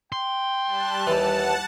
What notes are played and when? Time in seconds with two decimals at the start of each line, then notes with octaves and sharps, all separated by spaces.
0.12 G5 C6
0.65 G3 A5 F#6
1.07 D#2 E3 F#5 A5